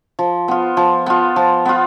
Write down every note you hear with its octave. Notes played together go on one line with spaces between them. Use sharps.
F3
B3 F4
F3
B3 F4
F3
B3 F4